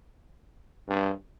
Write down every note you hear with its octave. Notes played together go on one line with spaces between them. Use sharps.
G2